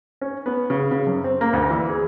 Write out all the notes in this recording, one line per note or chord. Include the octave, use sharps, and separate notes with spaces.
C#4
B3
C#3
C#3
F#2
C4
A#3
D2
E3
G#4